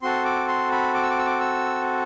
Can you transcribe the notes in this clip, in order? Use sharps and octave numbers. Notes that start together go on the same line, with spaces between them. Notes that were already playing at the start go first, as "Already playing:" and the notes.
C4 F#4 A4 C6
D6
C6
B5
D6
E6
D6
E6
D6
E6